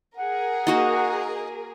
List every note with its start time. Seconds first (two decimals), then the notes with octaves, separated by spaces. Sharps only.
0.17 G#4 A#4 F#5
0.67 A#3 D#4 F#4 D#5